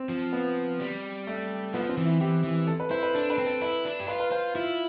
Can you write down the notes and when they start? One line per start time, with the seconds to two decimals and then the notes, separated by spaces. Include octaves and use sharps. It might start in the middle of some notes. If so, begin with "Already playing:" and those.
Already playing: C4
0.09 F3
0.33 B3
0.80 G3
1.27 A3
1.74 F3 B3
1.89 C4
1.97 E3
2.05 E4
2.20 E3 G4
2.43 E3
2.67 A4
2.80 B4
2.91 E4 C5
3.03 B4
3.14 D4 A4
3.30 B4
3.38 C4
3.46 A4
3.62 E4 B4
3.85 D4
4.00 G4
4.08 F4 B4
4.20 B4
4.32 F4 C5
4.55 E4 F4